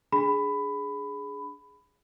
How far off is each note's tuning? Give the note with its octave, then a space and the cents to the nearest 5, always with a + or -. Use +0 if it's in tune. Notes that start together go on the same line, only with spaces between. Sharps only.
D4 +0 G#4 +0 B5 +15